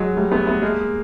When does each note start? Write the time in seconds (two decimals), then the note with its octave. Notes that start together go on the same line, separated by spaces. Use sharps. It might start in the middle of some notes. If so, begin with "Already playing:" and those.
Already playing: F#3 G#3
0.16 G3 A3
0.32 A3 B3
0.47 A3 B3
0.62 G#3 A#3